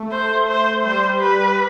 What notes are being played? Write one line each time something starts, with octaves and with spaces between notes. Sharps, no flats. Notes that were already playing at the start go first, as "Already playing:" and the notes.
Already playing: A3
C5
C5
G3 C5
B4